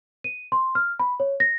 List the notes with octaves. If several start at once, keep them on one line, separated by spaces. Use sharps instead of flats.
D#7
C6
F6
B5
C#5
A#6